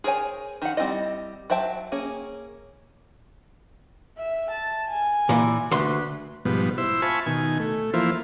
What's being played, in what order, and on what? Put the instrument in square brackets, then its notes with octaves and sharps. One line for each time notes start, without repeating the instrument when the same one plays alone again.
[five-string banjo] G#4 A#4 C5 C#5 G#5
D#3 F#5
G3 C4 D#4 E4 D#5
F#3 C5 E5 G5 A5
A#3 C#4 G#4
[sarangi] E5
A5
G#5
[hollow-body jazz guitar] A#2 E3
[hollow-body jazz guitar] D2 C6 [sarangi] B4
[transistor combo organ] G#2 B2 F3 G3 B3
E4 C5 E6
F4 E5 G#5 A5 B5 C#6
B2 D#3 G#5
A3
E3 F3 A#3 E4 F4 C5